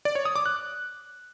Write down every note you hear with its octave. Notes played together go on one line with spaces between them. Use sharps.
D5
C#5
D#6
D6
F#6